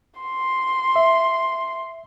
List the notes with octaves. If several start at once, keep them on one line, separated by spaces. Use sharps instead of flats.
C6
E5